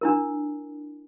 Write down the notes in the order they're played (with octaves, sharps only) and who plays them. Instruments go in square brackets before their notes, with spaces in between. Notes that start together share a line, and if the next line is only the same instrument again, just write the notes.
[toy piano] D4 E4 A#4